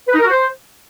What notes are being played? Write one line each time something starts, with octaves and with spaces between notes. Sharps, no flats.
B4
D#4
A#4
F#4
C5